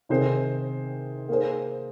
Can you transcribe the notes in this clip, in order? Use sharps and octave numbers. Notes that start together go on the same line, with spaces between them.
C3 D#3 C4 G#4 C5
A#3 G#4 C5